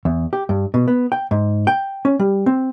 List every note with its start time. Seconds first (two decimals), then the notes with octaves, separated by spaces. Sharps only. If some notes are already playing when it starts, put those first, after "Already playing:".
0.05 E2
0.33 G4
0.49 G2
0.74 B2
0.88 B3
1.12 G5
1.31 G#2
1.67 G5
2.05 C#4
2.19 G3
2.46 C4